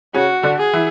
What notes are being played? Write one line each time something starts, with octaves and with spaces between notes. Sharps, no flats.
C#3 C#4 F#4
D3 D4
G#4
E3 E4